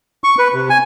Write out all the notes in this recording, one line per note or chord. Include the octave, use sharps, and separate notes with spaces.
C#6
B4
C3
G#5